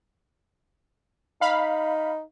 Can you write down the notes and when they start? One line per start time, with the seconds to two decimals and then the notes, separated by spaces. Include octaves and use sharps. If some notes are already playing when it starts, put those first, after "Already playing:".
1.41 D#4 F5 B5